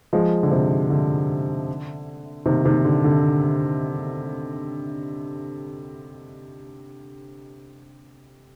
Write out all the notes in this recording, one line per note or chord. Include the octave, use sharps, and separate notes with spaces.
F3 G#3
D3
C3
D3
C3 D#3
C3 D#3
D3
D3